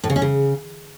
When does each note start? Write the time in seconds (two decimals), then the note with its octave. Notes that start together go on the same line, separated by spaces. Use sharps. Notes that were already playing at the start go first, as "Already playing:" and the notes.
0.04 A2
0.10 C#3
0.16 C#4
0.22 C#3